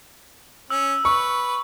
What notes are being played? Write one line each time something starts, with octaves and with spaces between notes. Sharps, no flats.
C#4 E6
B4 C#6